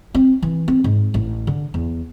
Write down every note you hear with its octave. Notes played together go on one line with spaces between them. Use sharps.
C4
E3
C4
G#2
A1
D3
E2